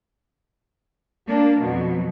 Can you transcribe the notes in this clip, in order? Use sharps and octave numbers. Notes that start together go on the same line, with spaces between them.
A#3 D4
F2 B2 F#3